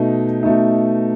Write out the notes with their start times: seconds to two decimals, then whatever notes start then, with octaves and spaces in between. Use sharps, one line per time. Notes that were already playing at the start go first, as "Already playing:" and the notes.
Already playing: B2 A3 D#4
0.43 B2 A3 D#4